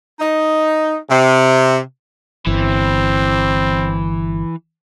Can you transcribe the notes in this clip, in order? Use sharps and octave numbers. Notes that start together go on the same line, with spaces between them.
D#4
C3
G1 E3 C4